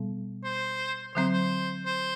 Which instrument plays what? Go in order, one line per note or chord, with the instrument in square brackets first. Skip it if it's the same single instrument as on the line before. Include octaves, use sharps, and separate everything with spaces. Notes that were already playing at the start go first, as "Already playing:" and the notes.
Already playing: [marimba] B2 G3 B3
[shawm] C5
[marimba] D3 F#3 C4 [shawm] C5
[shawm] C5
C5